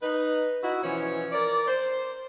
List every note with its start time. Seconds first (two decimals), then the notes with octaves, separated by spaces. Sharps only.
0.03 D#4 B4
0.62 D#4 E4 F#4
0.82 B2 E3 F3 C#4 E4 C#5
1.32 A#4 D5
1.68 C5